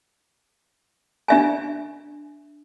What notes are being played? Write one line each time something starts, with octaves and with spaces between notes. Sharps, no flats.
D4 E5 G#5